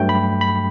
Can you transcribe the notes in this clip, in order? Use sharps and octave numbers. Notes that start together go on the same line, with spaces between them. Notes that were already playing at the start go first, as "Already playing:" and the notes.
Already playing: G2 F#3 A3 G5
B5
B5